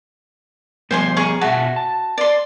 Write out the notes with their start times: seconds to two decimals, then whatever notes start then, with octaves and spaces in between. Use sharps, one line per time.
0.91 F3 G3 B3 C5 G#5 C6
1.17 G#4 A#4 C#6
1.41 B2 F#4 E5 A5
1.76 A5
2.18 D5 C6